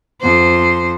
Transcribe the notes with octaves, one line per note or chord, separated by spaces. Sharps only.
F2 C5